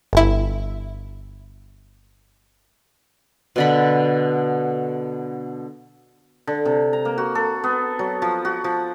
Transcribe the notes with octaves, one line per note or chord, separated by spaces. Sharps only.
G1 E4
B2 D3 B5
D3
C3
A#5
A#3
F#4
A4
B3
F#3
F3
F#4
F3